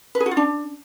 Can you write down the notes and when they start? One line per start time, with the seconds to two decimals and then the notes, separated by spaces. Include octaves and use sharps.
0.15 B4
0.20 G#4
0.26 F#4
0.31 F4
0.37 D4